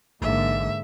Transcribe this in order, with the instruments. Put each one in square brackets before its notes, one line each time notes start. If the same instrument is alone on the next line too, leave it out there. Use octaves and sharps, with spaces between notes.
[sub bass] A1 [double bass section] G#2 D3 A#3 [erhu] E5